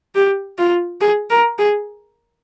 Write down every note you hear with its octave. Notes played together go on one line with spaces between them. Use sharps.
G4
F4
G#4
A#4
G#4